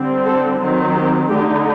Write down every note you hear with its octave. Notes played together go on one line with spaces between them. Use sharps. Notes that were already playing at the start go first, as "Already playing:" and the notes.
Already playing: D3 G3 C4
A4
D#3 F#3 C4
G4
D3 A3 D#4 G4